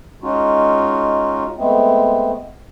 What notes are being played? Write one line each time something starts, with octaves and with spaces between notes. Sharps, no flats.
G#3 C#4 D#4 F4 F#4
G#3 A3 B3 C4